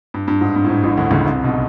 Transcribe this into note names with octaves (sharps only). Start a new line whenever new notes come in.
G2
G2
G#2
G2
A2
G#2
A1 A2
D2 D3
C#2 C#3
C2 C3
B1 B2